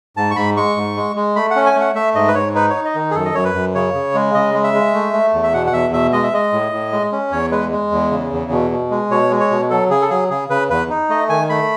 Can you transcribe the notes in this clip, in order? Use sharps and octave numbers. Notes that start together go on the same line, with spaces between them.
G#2 A5
C#6
G#2 B5
G#3 C#6
G#2
G#3
G#3
A3 B5
F#5
C#4
G#5
A3
F#5
A3 E5
G#2 D#5
B4
G#2 C#5
D#4 B4
D#4 C#5
D#5
D#3
G#4
F#2 A4
D#5
F#2 C#5
B4
F#2
C#3 C#5
C#3
G#3
C#3 D#5
G#3
E5
G#3
A3
A3
E2
E5
B2 F#5
F#5
E2 E5
B2 E5
G#3 D#5
E5
G#3 D#5
A2
A2
G#3
C#4
E2 C#5
G#3 B4
G#3
E2
C#3
E2
B2
B2
G#3
B2 C#5
G#3
C#5
B2
F#3 A4
C#3 G#4
A4
F#3 G#4
C#3 G#4
C#3 B4
E2 B4
D#4
A3 D#5
D#3 G#5
A3 B5